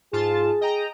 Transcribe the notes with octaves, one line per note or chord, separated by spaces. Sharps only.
G#2 F4 G#4 A5
D#5 G5 A#5